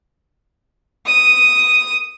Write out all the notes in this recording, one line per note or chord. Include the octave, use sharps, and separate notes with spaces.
D#6 D#7